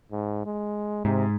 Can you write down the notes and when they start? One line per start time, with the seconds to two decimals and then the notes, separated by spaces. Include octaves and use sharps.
0.11 G#2
0.45 G#3
1.05 G#2 C3